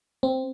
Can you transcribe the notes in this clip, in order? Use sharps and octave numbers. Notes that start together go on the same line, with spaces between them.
C4